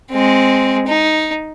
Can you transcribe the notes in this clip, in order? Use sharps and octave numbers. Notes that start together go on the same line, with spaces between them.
G#3 C4
D#4